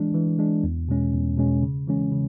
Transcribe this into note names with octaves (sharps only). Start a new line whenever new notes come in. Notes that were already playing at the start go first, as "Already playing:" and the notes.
Already playing: E3 G#3 D4
E3
G#3 D4
E2
B2 G#3 C#4
E2
B2 G#3 C#4
C#3
E3 G#3 C#4
C#3